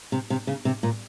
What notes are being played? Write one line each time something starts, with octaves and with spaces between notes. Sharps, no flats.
C3
C3
C#3
C3
A#2